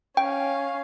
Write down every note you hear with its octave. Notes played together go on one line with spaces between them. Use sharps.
C#4 F5 G5